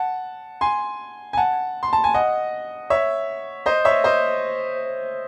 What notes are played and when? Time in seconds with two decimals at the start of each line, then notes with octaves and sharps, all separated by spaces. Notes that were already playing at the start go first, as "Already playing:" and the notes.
Already playing: F#5 A5
0.61 G#5 C6
1.33 G#5
1.37 F#5 A5
1.83 C6
1.93 A5
2.04 G#5
2.14 D#5 F#5
2.90 C#5 E5
3.66 C5 D#5
3.85 C#5 E5
4.04 C5 D#5